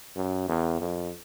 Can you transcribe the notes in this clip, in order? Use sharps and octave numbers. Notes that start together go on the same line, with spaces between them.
F#2
E2
F2